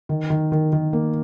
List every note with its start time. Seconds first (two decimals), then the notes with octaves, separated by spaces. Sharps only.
0.09 D#3
0.30 D#3
0.52 D#3
0.73 D#3
0.93 A#3